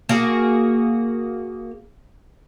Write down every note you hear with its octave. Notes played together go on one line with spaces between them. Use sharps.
A#3 F#4 G#4